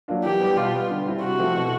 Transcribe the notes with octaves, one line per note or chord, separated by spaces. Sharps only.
F#3 A#3 D4 F4
E3 G4
G3 B3
B2 F4
G3 B3
D3
G3 C4 E4
C3 F#4
F3 A3 C4 E4
B2